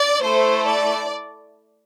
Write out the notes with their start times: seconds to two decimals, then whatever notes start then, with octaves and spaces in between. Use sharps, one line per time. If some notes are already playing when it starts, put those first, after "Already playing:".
Already playing: D5
0.22 A3 E4 A4 C5
0.67 D5